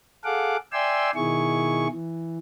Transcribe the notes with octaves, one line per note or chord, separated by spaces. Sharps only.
G#4 A4 F5 F#5 D6
D5 E5 G5 G#5 C6 E6
B2 D#3 E4 G#4 C#6
E3